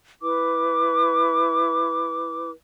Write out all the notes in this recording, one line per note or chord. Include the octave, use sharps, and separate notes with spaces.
E4 B4 D6